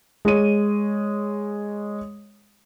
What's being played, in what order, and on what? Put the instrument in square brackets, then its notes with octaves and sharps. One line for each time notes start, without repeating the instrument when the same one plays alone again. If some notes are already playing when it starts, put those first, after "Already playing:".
[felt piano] G#3 C#5 D#7